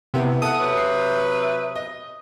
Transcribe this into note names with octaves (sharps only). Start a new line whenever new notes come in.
C3 B3 E4 G4
A4 E5 F#5 D#6
C3 F#3 B4
C7
D#5